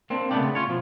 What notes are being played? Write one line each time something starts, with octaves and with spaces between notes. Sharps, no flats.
A#3 C4 D4
C#3 A3 B3 C#4 D4 G4
C#4 F4 C#5
B2 F3